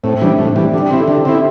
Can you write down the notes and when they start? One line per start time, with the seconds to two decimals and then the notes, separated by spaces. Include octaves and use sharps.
0.03 A2 C4
0.21 E3 G3 D4
0.39 A2
0.56 E3 G3
0.73 D3 G4
0.90 C4 E4 G4
0.99 A4
1.08 D3 G4
1.25 C4 E4